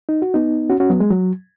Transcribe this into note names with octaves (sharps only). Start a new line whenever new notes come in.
D#4
F#4
B3 D#4
C#4 F#4
C#4 F#4
F#3 B3
G#3
F#3